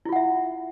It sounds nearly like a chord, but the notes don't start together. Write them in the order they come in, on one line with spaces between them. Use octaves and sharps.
E4 F4 F#5 E5